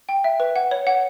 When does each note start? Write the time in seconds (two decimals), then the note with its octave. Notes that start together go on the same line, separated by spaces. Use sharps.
0.09 G5
0.24 E5
0.40 B4
0.56 F#5
0.71 C#5
0.87 F#5